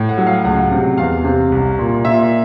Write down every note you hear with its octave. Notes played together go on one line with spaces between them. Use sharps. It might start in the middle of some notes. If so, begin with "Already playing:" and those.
Already playing: A2
F#5
F#3
F5
C#2 F#5
C3
E2 F5
C3
C2
A#2
A#2 E5